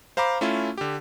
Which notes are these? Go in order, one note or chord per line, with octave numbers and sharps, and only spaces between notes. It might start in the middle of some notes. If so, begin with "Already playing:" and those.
C5 F5 A#5 B5 D6
A3 C#4 E4 F4
D3 G4